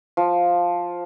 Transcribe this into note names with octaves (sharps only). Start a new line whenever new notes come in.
F3